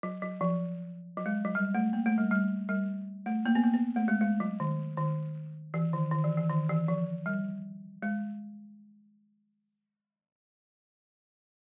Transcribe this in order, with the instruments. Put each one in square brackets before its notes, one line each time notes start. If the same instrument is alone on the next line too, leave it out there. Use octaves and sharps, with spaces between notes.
[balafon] F#3
F#3
F3
F#3
G#3
F#3
G3
A3
A#3
A3
G3
G3
G3
A3
A#3
B3
A#3
B3
A3
G#3
G#3
F#3
D#3
D#3
E3
D#3
D#3
E3
E3
D#3
E3
F3
G3
G#3